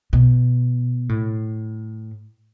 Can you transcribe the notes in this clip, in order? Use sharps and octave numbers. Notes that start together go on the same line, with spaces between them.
B2
A2